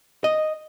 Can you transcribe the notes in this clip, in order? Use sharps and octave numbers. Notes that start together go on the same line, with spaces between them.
D#5